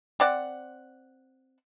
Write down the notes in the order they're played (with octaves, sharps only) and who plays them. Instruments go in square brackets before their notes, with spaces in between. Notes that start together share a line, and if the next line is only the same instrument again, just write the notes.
[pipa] C4 D5 F#5